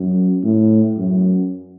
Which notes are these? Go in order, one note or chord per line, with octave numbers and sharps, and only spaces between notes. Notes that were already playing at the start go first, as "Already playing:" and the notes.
Already playing: F#2
A2
F#2